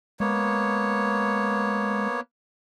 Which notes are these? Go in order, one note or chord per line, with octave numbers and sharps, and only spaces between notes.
G#3 A#3 B3 C#5